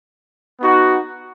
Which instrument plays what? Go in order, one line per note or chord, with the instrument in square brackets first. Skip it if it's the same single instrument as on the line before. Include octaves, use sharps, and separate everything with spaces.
[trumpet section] B3 D#4 F#4